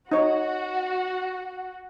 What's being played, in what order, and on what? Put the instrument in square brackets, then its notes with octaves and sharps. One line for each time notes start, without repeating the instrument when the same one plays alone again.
[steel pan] D#4 C#5 [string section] F#4